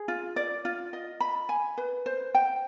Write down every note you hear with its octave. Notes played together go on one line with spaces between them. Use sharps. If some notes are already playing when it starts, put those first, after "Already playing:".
Already playing: G#4
F4
D5
F4
D#5
B5
G#5
B4
C5
G5